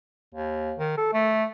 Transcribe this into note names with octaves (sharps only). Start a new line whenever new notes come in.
D#2
D#3
A4
A3